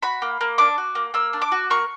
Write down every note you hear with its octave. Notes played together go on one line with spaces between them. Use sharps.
F#4 B5
A#3
A#3
D4 D6
F#4
A#3
A#3 E6
D4
D6
F#4
A#3 C#6